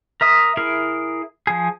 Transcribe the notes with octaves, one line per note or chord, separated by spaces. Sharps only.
A#4 E5 D#6
E4 G#4 A#4
F3 G#4